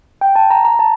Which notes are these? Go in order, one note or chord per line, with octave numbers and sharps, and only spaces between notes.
G5
A5
A#5
A#5
A5